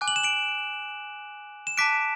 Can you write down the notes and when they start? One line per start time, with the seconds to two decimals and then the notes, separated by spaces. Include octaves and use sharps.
0.01 G#5 D6 F#6
0.08 F#7
0.16 E7
0.24 D7 F#7
1.67 E7
1.77 A5 D6 F#6 B6 D7